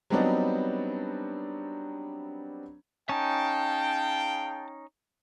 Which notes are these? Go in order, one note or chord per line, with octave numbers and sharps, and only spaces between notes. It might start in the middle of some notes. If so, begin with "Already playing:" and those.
F#3 G3 B3 C4 D4 D#4
C#4 D#4 G#4 F5 G5 A5